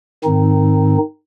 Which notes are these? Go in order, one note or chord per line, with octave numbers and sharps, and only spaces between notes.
G#2 D#3 C4 D#4